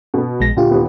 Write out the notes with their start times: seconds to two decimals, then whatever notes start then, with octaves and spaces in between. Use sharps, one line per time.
0.14 B2 B3
0.40 A#1 G#3 A#6
0.57 D2 A#2 F4 G4
0.71 D#2 B3